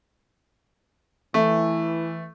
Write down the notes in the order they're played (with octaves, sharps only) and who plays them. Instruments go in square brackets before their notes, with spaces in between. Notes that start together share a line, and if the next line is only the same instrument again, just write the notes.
[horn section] E3 [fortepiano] A3